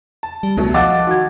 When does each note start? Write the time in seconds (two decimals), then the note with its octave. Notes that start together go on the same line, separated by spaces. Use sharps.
0.23 A5
0.43 G3
0.57 C#2 B2 F#3 A3
0.74 F3 D#5 F5 F#5 A5 D6 E6 A6
1.07 D#3 F#4 G#6